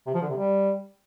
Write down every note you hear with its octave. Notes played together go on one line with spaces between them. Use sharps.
C3
F3
D3
C3
G3